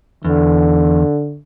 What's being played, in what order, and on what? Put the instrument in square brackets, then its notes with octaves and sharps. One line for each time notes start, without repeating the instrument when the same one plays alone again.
[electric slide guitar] E2 [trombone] D3